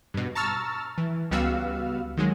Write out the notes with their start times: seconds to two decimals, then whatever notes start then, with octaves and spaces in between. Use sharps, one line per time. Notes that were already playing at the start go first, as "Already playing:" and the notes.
0.14 G2 B2
0.35 A5 A#5 C#6 E6 F6 A6
0.98 E3
1.31 C#2 G3 B3 F#4 F5 E6
2.17 D#3 F#3 G#3